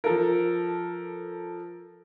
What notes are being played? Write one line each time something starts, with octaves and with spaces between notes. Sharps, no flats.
F3 A4 A#4